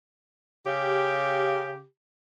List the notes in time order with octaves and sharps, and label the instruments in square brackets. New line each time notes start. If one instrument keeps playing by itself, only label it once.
[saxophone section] C#3 G4